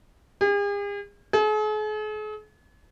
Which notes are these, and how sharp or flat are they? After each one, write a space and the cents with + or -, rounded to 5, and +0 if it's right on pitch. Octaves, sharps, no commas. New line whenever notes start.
G#4 -45
G#4 +45